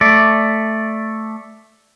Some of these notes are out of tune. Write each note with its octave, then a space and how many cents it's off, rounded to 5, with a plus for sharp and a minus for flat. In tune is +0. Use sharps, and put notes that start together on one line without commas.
A3 +0 D5 +0